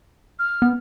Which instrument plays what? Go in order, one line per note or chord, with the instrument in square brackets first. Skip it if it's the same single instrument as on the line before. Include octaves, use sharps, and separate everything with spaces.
[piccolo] F6
[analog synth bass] B3